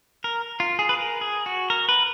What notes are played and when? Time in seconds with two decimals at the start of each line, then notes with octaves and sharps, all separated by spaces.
0.24 A#4
0.60 F4
0.79 G#4
0.89 B4
0.97 A#4
1.21 G#4
1.46 F#4
1.70 A#4
1.89 B4